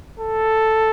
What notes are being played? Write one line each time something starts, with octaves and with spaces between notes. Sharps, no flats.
A4